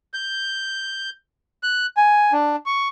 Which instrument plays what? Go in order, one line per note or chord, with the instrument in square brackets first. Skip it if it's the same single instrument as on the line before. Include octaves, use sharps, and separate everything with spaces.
[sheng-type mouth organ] G6
F#6
G#5
D4
C#6